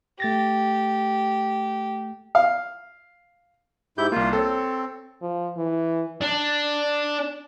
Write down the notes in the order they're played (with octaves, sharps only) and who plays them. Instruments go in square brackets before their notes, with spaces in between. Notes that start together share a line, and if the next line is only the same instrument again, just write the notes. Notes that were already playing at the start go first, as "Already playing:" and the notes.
[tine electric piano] A3 A6 A#6 [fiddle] G4
[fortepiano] F5
[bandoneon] G#2 E4 G6 [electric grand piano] G4
[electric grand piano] C2 A#3 [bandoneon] F4
[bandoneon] C4 [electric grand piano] A4 C#5
[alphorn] F3
E3
[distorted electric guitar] D4